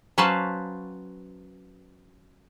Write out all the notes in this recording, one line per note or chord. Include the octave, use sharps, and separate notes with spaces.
F#3 C#4 B4 C5 F5 A5